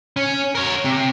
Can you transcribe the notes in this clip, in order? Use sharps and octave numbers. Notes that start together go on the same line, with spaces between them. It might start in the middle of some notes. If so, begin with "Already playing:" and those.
C#4
A#4 C#5
C3